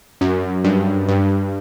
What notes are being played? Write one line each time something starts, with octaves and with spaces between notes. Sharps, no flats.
F#2
G2
G2